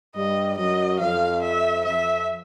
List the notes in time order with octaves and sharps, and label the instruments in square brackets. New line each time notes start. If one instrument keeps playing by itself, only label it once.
[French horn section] G2 G3 [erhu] D#5
[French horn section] F#2 F#3 [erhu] D#5
[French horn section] F2 F3 [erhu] F5
[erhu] E5
[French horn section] F2 F3 [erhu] E5